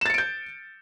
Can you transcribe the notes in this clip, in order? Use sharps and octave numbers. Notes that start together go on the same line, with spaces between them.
G6 A6 C#7 D7 E7